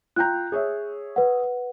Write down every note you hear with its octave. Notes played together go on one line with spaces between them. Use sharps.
F4 G5 A#5 F#6 G6
G#4 C#5 E5
B4 F#5